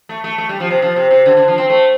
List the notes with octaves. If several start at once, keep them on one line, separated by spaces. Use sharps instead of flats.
A3
A3
A3
G3
F3
C3
F3
C3
C3
D3
D3
F3
C4
A3